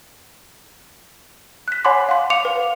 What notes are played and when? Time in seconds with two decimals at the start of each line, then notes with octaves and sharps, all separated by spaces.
1.68 F#6 B6
1.85 C#5 F#5 G#5 B5 C6 D6
2.09 F5 F#5 C6
2.30 F5 D6 C#7 F7
2.45 B4